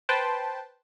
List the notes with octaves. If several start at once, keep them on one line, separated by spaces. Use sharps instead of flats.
B4 C5 G5 A5